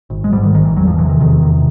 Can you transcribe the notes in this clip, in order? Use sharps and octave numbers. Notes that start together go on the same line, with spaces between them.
G#1
G#3
G#2 G3
D#3
G#1 D#3
E3
E2 F#3
F3
C3 E3
D#3
E2 D#3
C3